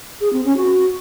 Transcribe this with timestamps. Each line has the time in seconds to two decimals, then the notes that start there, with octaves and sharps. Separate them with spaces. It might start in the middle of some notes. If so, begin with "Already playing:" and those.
0.21 G#4
0.33 C4
0.45 C#4
0.57 F#4